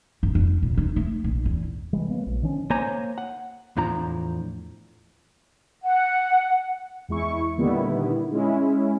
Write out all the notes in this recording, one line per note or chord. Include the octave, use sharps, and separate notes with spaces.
F#2
F2
A#2
D#4
A3
A#1
E2
C3 E3 G3 G#3
F#3 A#3 B3
A#1
D3 D#3 F3 C#4
A#3 C5 C#5 G#5 A#5
F#5
E2 A2 F3 D4 A#5
F#5
E2 G#3 E4 C#6
A#2 D3 D#3 G3 B3 E4
G#3 C#4 E4